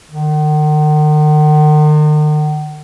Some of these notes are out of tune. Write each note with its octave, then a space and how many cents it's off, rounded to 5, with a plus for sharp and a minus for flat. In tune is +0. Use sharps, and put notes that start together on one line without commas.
D#3 -45